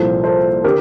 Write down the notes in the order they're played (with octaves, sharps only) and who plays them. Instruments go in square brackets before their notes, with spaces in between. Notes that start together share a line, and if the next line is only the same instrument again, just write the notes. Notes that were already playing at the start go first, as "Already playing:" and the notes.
Already playing: [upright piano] C2 A#2 F3 A4 C5
A4 C5
D3 G4 A#4